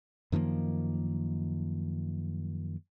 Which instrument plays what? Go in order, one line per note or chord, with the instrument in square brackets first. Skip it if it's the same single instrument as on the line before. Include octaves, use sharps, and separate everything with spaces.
[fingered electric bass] F#2 D#3 F3 A#3